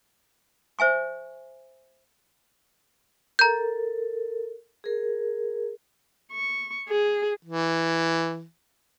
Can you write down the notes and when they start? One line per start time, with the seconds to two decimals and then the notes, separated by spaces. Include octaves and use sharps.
0.79 C5 E5 G#5 C#6
3.39 A4 A#4 A#5 G6
4.84 G#4 A#4
6.32 C#6
6.89 G#4
7.45 E3